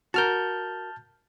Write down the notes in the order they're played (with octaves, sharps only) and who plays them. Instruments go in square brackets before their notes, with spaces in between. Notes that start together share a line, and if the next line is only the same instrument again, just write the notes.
[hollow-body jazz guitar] F#4 A#4 [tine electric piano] A5 F6 G6